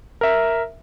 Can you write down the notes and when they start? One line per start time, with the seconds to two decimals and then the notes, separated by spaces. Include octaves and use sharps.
0.21 A#4 E5